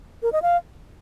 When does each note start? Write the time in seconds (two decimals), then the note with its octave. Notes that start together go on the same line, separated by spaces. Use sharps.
0.23 A#4
0.32 D#5
0.42 F5